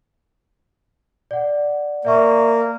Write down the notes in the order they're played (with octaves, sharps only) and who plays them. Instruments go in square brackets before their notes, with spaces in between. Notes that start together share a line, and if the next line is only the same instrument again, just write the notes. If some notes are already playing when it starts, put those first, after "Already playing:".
[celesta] D5 F#5
[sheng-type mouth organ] A#3 [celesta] D5 E5 C#6